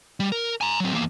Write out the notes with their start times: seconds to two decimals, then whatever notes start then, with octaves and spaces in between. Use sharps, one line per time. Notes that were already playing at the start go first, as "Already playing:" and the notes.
0.20 G3
0.32 A#4
0.61 G#5 A#5
0.80 F#3 C4
0.93 E2 A#3